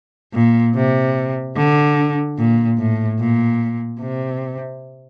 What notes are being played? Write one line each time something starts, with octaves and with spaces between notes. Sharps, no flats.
A#2
C3
D3
A#2
A2
A#2
C3